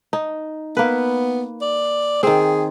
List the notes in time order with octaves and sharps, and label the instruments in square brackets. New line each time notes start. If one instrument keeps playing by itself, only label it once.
[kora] D#4
[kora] A#3 B4 [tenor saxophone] B3
[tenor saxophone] D5
[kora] D#3 C4 [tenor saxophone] G#4